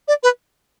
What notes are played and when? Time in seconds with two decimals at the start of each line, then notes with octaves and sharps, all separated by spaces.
0.08 D5
0.23 B4